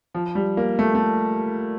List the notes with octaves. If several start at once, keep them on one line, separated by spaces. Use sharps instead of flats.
F3
G3
A#3
A3
A3